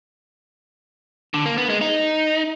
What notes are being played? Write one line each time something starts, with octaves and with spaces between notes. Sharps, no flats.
D3
A#3
B3
G#3
D#4